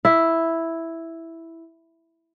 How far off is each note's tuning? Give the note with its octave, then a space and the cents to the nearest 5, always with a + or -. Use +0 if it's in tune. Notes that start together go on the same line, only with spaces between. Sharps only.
E4 +0 E5 +0